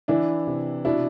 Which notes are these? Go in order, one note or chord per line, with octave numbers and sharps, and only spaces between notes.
E3 D4 E4
C3
B2 D4 E4